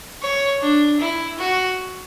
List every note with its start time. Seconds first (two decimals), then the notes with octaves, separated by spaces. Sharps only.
0.22 C#5
0.61 D4
1.00 E4
1.38 F#4